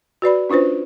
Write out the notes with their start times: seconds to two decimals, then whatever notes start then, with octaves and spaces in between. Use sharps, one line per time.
0.22 F#4 B4 D5 B5
0.49 C#4 D4 F4 B4 C5